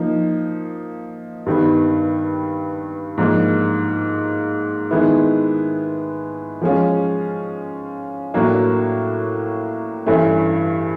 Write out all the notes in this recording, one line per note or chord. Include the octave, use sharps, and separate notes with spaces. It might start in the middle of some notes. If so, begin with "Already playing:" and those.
Already playing: F3 A#3 D#4
G2 D#3 G3 B3
G#2 F3 A#3 D4
D#3 G#3 B3 E4
F3 G#3 C#4 F4
A2 F#3 A#3 D4
G2 E3 A3 C#4